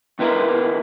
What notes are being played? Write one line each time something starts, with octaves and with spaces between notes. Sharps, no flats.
D#3 B3 E4 A#4